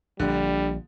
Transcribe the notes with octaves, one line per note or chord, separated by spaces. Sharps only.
A#1 A#2 D3 G3